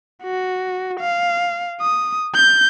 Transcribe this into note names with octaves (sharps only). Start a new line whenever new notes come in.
F#4
F5
D#6
G6